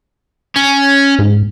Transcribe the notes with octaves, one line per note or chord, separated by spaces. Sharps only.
C#4
G#2